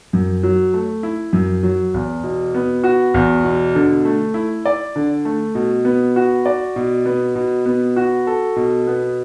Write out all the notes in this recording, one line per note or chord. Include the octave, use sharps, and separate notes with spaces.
F#2
F#3
A3
E4
F#2
F#3
E2
B2
B3
F#4
E2
B2
D3
A3
E4
D5
D3
A3
B2
B3
F#4
D5
B2
B3
B2
B3
F#4
A4
B2
B3